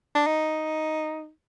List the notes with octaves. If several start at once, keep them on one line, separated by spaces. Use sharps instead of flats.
D4
D#4